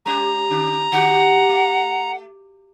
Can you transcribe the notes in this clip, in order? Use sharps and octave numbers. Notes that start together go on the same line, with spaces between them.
G3 C#4 G4 A#5
D3 C#4 D4
D3 F#4 G4 F#5
A3